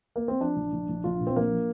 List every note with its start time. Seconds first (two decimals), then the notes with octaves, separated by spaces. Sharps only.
0.16 A#3
0.28 C4
0.40 F3 D4
0.56 A#1
0.72 A#1
0.89 A#1
1.04 A#1 F4
1.21 A#2
1.27 C4
1.36 A#1 A#3
1.51 F3